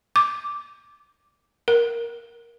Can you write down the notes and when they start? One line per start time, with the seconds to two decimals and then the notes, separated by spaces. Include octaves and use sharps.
0.16 D6
1.68 A#4